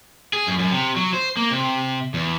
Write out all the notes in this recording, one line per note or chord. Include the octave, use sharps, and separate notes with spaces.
G#4
F#2
F#2
C3
F#3
C5
A#3
C3
E2